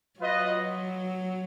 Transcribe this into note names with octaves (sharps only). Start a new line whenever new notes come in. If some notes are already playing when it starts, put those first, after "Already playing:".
F#3 F4 B4 D#5